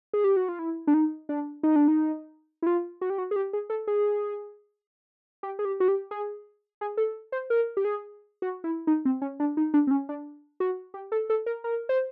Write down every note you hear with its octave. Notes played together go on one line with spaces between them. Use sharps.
G#4
G4
F#4
F4
E4
D4
D#4
D4
D#4
D4
D#4
E4
F4
F#4
G4
F#4
G#4
G4
G#4
A4
G#4
G4
G#4
G4
F#4
G4
G#4
G#4
A4
C5
A#4
G4
G#4
F#4
E4
D#4
C4
C#4
D4
D#4
D4
C4
C#4
D4
F#4
G4
A4
A4
A#4
A#4
C5